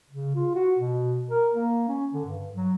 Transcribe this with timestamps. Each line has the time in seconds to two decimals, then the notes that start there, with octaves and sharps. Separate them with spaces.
0.11 C#3
0.36 F4
0.55 F#4
0.79 B2
1.31 A#4
1.54 A#3
1.88 C#4
2.14 D3
2.25 G2
2.55 F#3